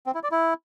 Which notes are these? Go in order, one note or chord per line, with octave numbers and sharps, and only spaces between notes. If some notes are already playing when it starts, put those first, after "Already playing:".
C4
E4
D5
E4